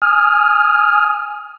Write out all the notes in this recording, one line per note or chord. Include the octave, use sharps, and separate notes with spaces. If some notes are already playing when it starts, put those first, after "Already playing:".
G#5 D#6 F6